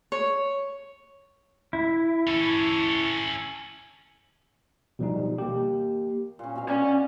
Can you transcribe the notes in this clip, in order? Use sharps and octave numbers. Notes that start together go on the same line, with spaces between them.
C#5
E4
C#4 A4
B2 F3 G3 D#4
A#3 G4
A#2 C#4
B2 F5
C#4 D5 F#5 G#5